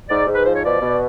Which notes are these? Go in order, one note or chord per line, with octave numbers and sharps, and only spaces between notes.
G#2 D5
G#2
B4
F3 C5
C#5
B2 D5
B2